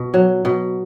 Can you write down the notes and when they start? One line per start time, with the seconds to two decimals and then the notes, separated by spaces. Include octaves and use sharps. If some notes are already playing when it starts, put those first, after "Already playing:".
Already playing: B2
0.14 F#3
0.45 B2